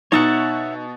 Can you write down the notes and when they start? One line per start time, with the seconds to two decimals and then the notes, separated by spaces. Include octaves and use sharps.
0.12 B2 D#4 C#5 E5 F#5 A6 C#7